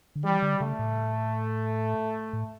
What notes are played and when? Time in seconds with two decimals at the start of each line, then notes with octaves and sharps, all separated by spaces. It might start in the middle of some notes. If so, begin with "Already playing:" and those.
0.15 D3
0.24 E3 G3
0.42 D3
0.60 C#3 A3
0.79 A2
2.33 A2